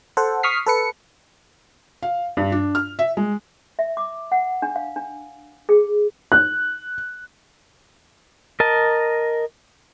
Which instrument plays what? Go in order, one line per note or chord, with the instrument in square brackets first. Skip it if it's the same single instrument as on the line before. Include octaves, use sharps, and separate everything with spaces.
[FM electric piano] A4 C5 F#5
C#6 D#6 F6 B6 C7
A4 B4 C#7
[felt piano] F5
G2
D4
F6
E5
G#3
[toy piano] E5
D6
F#5
D4
F5
D4
G#4
[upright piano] F#6
[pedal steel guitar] A#4 D#5 A5